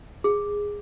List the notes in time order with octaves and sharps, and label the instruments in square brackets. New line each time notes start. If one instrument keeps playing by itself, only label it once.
[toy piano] G#4